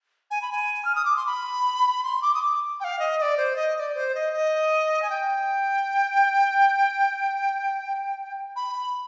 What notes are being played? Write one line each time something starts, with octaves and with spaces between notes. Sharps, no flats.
G#5
B5
G#5
F6
D#6
D6
C6
B5
C6
D6
D#6
D6
G5
F5
D#5
D#5
D5
C5
D#5
D#5
D5
C5
D#5
D#5
G#5
G5
B5